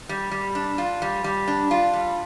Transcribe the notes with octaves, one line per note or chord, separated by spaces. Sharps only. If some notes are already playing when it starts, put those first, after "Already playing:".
G3
G3
D4
F4
G3
G3
D4
F4
G3